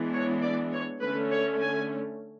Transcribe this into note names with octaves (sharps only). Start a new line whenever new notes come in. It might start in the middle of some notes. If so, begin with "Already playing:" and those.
Already playing: E3 G#3 B3 D4
C#5
D5
C#5
D3 A3 C#4 B4
C#5
G#5